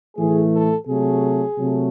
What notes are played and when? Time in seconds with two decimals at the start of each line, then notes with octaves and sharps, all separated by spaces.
0.16 A2 E3 A3 G#4
0.52 A4
0.87 C3 F#3 A3 G#4
1.58 C3 F#3 A3